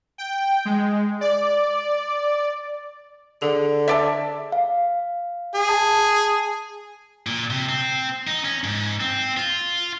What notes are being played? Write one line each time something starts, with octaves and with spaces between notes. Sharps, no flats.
G5
G#3
D5
D3 G#4
A4 D5 E5
F5
G#4
A5
A#2
C3
C4
D#4
C#4
G#2
C4
F4